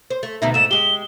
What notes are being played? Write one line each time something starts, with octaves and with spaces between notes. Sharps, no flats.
C5
A3
D2 B2 D#4 E5
G#2 A3 E7
G#3 G4 G7